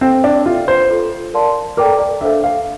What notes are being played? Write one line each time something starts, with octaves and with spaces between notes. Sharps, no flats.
C4 A4 C5 F5
D4
F4 A4 E5 G5
C5
F4 A4 C5
A#4 D5 F5 A5 C6
A4 A#4 D5 G5 A#5 D6
D5
D4 A4 C5 E5 F5
F5